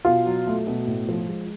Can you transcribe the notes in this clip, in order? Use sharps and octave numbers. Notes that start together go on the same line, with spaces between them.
B2 F4
F#3
A3
B2
A2
F3
G#3